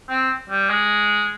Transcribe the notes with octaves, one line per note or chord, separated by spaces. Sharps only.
C4
G3
G#3